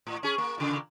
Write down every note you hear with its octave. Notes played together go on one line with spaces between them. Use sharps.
A2
C#4 G#4
A#3
A#2 C#3